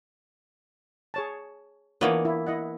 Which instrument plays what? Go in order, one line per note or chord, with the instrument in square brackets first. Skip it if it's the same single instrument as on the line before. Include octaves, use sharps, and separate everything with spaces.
[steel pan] G#4 C#5 A5
[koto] E3 A#3 B3 [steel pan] D4 F4 C#5
[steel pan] E4
E4 D#5 F#5